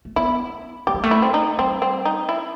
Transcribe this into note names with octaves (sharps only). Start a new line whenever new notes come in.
A3
B3 E4
A3 G4
G3
A3
E4
C4
D#4
G3 C4
C4
D#4
E4